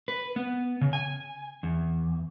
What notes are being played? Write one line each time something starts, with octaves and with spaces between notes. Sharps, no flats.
B4
B3
C#3
G#5
E2